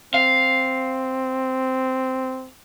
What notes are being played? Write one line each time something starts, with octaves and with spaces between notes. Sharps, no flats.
C4 F5